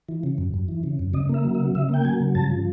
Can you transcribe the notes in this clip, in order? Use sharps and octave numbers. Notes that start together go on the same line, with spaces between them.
E3
C#3
F#2
F#2
E3
C#3
F#2
C#3 D#5
A#3 E5
F#3
E5
C#3
C#3 E5
A#3 G5
F#3 G#5
C#3
G2 A5
F3